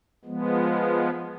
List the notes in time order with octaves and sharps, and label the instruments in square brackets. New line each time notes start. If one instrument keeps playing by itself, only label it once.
[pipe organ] F3 G#3 B3